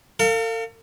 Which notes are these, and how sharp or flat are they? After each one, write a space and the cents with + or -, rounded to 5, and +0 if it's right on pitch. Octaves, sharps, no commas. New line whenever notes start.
A4 +45 F5 +0